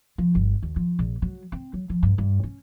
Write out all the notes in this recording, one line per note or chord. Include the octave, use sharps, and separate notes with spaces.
F3
G1
D#2
F3
A#1
F#3
C4
F#3
F3
G2
G2
C#4